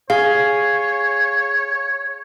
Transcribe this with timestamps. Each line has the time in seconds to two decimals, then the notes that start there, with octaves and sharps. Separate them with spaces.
0.10 G#4 C#5 F5